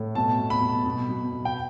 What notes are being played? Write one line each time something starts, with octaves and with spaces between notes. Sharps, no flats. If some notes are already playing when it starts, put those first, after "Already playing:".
Already playing: A2
B2 A5
B2
B5
B2
B2
B2
B2
G5